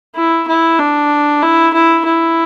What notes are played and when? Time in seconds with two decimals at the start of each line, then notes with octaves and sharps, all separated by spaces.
0.16 E4
0.48 E4
0.79 D4
1.42 E4
1.74 E4
2.05 E4